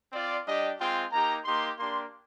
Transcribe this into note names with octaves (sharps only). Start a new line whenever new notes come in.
C4 F4 D5
G3 D4 G4 D#5
G#3 C4 F4 G5
A#3 D#4 G4 A#5
A#3 D#4 G4 C6
A#3 D4 G4 C6